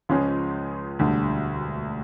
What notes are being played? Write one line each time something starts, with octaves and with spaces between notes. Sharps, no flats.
C#2 C#3 F3 G#3 C#4
E1 D2 D3 G3